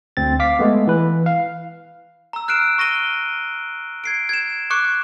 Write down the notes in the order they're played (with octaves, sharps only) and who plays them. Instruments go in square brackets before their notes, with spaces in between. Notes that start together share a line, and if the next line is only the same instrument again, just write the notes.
[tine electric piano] D2 C4 A6
F5 D6 B6
G#3 A3 B3
E3 B4
F5
[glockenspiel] A#5 E6
F6 F#6 C7 D7 E7
C#6 A#6 D#7 G7
G#6 C7 D7
G#6 E7
C#6 D6 F#6 C#7